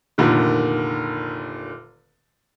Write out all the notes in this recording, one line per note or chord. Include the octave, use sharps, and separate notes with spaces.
F1 A#2 D3 D#3